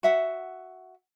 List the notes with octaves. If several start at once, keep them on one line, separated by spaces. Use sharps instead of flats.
F#4 E5 F#5